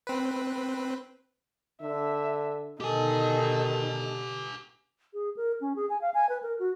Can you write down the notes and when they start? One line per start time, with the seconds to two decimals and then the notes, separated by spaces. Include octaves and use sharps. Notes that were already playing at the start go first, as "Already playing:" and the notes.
0.07 C4 B4
1.81 D3 E5
2.80 B2 D3 D#3 D#4 G4 A4 G#5
5.14 G#4
5.37 A#4
5.61 C#4
5.76 G#4
5.90 G#5
6.01 F5
6.14 G#5
6.29 B4
6.42 A#4
6.59 F#4